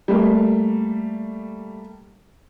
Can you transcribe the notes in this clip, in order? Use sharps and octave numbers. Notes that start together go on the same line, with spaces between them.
G3 A3 A#3